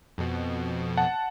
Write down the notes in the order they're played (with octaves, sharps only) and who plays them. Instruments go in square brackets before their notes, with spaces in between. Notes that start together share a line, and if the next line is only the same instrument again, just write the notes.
[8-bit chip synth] F2 B2
[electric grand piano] F#5 A5